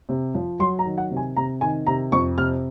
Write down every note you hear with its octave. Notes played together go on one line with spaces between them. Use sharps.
C3
F3
F#3 C6
A#5
D#3
F#5
C3
G#5
C3 A#5
D#3 G#5
C3 A#5
F2 C#6
C3 F6